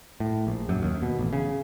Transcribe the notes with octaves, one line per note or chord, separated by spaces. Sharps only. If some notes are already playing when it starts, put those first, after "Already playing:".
A2
A#1
F#2
D#2
B2
A1
C#3